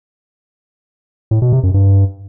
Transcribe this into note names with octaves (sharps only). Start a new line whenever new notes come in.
A2
B2
C3
F#2
G2